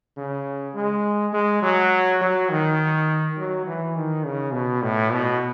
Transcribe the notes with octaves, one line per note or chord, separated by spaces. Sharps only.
C#3
G#3
G#3
F#3
F#3
D#3
F#3
E3
D#3
C#3
B2
A2
B2